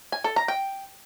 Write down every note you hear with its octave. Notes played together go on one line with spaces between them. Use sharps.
G#5
A4
A#5
G5